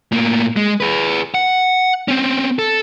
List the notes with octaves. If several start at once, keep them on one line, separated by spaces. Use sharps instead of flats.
A2 A#3
G#3
G#4 B4
F#5
C4 C#4
A4